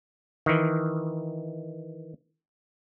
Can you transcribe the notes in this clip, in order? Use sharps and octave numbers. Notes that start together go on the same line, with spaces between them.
D#3 E3